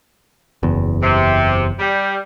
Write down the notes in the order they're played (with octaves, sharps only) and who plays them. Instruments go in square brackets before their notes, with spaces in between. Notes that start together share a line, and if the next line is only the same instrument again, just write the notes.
[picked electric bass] F#1 E2
[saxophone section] C3
G3